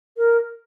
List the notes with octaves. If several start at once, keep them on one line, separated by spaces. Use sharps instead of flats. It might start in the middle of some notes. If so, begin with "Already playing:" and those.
A#4